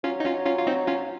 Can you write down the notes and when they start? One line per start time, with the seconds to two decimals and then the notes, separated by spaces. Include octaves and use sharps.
0.04 F#3 C#4 F4
0.20 D#4
0.25 C#4 F4
0.46 C#4 F4
0.59 F4
0.67 C4 D#4
0.87 C#4 F4